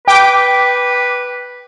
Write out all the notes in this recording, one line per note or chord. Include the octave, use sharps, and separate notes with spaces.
B4 G5 D6